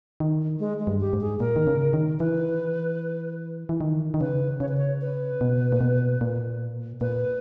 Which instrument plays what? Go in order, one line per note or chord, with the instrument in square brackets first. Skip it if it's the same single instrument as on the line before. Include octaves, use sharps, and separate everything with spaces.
[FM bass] D#3
[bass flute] G#3
G#3
[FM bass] G2
[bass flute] G4
[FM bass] G#2
[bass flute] G#4
[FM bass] A#2 [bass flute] A#4
[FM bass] D#3
C#3
D#3
[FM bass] E3 [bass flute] B4
[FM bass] E3
D#3
D#3
[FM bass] C#3 [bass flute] B4
[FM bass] C#3 [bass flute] C#5
[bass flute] B4
C#5
B4
[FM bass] B2
A#2
B2
A#2
[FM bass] A#2 [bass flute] B4